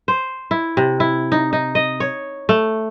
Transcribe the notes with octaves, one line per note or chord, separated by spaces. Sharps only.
C5
E4
C3
E4
D#4
D#4
D#5
C#5
A3